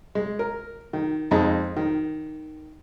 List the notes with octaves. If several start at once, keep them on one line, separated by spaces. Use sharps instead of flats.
G#3
A#4
D#3
F2 G#3 D#4
D#3